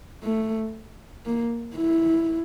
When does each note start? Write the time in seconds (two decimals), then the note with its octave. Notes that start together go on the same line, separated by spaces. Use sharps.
0.23 A3
1.26 A#3
1.76 E4